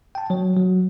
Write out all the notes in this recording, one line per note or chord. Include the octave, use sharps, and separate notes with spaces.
G5 A5
F#3 C#5
F#3